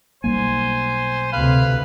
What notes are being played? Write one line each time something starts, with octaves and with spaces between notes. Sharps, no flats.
B1 G3 A#3 C5 G#5
D2 C3 B4 F5